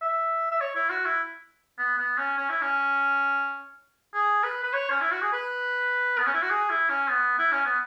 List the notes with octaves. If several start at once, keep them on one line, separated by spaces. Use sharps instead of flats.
E5
E5
C#5
E4
F#4
E4
B3
B3
C#4
C#4
E4
C#4
G#4
B4
B4
C#5
C#4
E4
F#4
G#4
B4
B3
C#4
E4
F#4
G#4
E4
C#4
B3
E4
C#4
B3